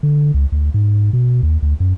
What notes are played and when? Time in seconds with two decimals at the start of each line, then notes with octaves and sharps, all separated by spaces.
0.03 D3
0.34 C#2
0.52 D2
0.74 G#2
1.13 B2
1.43 D#2
1.62 D2
1.80 F#2